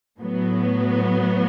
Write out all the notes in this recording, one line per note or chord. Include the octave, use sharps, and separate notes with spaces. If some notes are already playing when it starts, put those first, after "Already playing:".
A2 F#3 B3